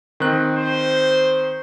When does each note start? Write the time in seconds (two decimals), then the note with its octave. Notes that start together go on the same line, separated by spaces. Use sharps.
0.20 D#3 C4 F#6
0.58 C5